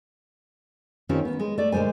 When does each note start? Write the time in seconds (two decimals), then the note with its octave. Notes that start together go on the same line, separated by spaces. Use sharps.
1.09 D#3 C4 C#4 F4 G4
1.25 B3
1.40 G#3
1.58 A3 D5
1.72 A#2 D3 G#3 C5 G#5